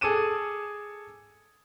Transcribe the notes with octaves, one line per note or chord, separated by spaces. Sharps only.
G#4 A4 D6 D#7 E7